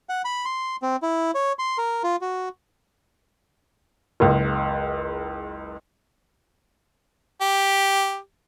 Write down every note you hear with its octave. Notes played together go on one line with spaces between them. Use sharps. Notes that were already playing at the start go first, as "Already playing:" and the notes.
F#5
B5
C6
C4
E4
C#5
C6
A#4
F4
F#4
F#1 C#2
G4